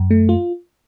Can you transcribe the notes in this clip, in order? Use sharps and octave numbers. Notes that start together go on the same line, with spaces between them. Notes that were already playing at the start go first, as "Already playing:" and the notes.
Already playing: F#2
A3
F4